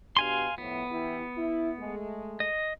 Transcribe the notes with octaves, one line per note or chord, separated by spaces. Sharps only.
B2 D4 G4 F5 G#5 C6
A2 F3 B3 E4
E3 E4 G4
E4
G#3 A3
D#5